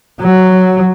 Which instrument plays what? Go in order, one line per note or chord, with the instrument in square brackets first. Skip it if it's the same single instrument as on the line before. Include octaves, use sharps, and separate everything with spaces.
[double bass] F#3